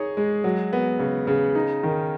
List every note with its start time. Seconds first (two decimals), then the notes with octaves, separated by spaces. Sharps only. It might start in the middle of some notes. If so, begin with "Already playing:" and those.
Already playing: D#4 G#4 C#5
0.17 G#3
0.44 F#3
0.73 B3
0.99 C#3
1.27 C#3
1.55 D#4
1.83 D#3